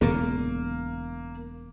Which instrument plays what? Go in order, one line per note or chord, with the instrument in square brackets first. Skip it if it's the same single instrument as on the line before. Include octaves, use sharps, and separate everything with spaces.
[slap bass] E1 A#2 C#3 [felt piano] A#3